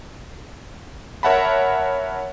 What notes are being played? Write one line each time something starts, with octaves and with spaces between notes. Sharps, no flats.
A#4 C#5 E5 F#5 A5 B5